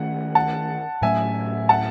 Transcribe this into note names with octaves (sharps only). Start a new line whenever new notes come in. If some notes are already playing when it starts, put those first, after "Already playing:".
Already playing: D#3 A3 C#4 F#5
F#5 A5
A2 F#3 A3 C#4 E5 G#5
F#5 A5